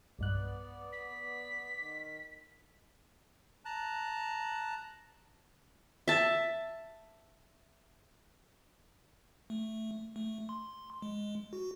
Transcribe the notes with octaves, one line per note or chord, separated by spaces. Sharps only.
B1 G2 B3 D5 F#6
B6
D#3
A5 A#5 F#6
E5 A5
A3
A3
C6
G#3
F#4